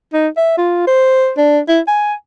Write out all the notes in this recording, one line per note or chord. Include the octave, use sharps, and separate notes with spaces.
D#4
E5
F4
C5
D4
E4
G#5